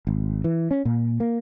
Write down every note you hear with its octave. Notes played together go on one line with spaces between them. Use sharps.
G#1
E3
C#4
A#2
A#3